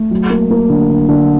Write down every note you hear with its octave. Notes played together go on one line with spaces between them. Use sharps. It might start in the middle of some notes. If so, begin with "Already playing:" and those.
Already playing: A3
F#3
A#3
A#3
D3
D3
D3